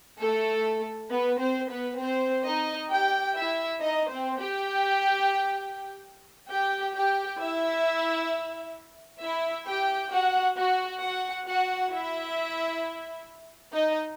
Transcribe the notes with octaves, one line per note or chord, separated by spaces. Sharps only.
A3 A4
B3 B4
C4 C5
B3 B4
C4 C5
D#4 D#5
G4 G5
E4 E5
D#4 D#5
C4 C5
G4 G5
G4 G5
G4 G5
E4 E5
E4 E5
G4 G5
F#4 F#5
F#4 F#5
F#4 F#5
F#4 F#5
E4 E5
D#4 D#5